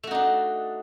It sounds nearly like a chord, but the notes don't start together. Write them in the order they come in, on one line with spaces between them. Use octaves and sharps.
A3 F#4 D#4 D4